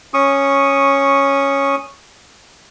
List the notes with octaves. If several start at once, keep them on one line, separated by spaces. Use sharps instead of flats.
C#4 C#6 D#6